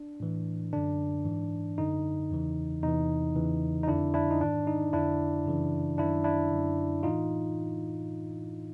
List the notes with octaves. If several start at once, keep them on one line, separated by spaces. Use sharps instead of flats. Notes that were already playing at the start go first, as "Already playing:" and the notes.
Already playing: D4
A2 E3
F#2 D3 D4
G#2 E3
F#2 D3 D#4
E2 C#3 E3
E2 C3 E3 D#4
E2 C#3 E3
D#4
F2 D3 D4 E4
D4 E4
D#4
G#2 D#3 D4
D#4
F2 D3 D4 E4
F#2 C#3 E3
F#2 D#3 D4 E4
D4 E4
F#2 D3
A2 E3 D#4 F4